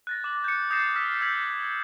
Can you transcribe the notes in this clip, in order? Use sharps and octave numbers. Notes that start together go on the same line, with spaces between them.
F#6 A6 A#6
D6 F#7
G6 C#7
D#6 G6 A6 A#6 C7 E7
E6 F6 B6
E6 G6 G#6 B6 F#7